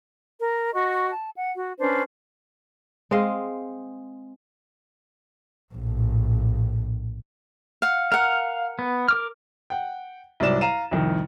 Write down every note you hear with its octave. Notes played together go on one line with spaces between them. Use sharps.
A#4
F#4 D#5 C#6
A5
F#5
F#4
C#4 D4 B4 C5
G#3 C4 D#5 F5
A#1 A2
F5 F#5
A#4 F5 F#5
B3
A#4 D6 F6
F#5 G5
C2 G#2 F#3 D5 E7
F5 A#5 D#7 E7
C2 F2 D#3